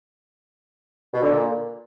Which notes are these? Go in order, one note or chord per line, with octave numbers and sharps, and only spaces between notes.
B2
D3
A#2